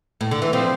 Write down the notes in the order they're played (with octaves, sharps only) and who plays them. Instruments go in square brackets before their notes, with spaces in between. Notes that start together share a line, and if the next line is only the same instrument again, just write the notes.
[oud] A2
D3
E3
[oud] F3 [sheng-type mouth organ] C4